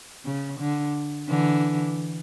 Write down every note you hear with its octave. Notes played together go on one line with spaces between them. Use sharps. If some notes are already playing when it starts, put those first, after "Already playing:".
C#3
D3
D3 E3